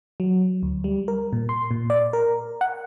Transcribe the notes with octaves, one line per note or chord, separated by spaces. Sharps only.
F#3
D2
G3
A#4
A#2
C6
A#2
D5
A#4
F#5